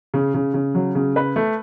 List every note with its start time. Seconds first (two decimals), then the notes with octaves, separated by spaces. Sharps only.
0.14 C#3
0.34 C#3
0.54 C#3
0.75 F#3
0.95 C#3
1.16 B4
1.36 A3